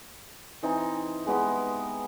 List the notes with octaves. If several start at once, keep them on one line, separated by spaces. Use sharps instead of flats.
E3 C4 D#4
G#3 B3 D#4 G4